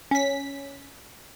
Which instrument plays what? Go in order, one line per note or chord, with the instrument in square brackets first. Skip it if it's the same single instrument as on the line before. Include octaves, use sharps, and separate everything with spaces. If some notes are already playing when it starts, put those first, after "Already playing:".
[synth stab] C#4 B6